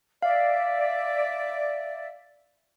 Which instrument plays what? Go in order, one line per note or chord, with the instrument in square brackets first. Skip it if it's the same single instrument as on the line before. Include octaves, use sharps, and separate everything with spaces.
[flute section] D5 E5 [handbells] F5